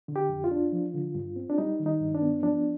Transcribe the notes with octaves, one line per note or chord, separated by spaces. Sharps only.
D3
G4
F2
F4
D4
F3
D3
G2
C4
D4
G3 D#4
D#3
D#4
G2
D4
B3
F3 D4